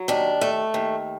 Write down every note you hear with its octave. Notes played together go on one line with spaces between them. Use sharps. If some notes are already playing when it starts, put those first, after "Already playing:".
Already playing: F#3
D#2 D4
A3
D#2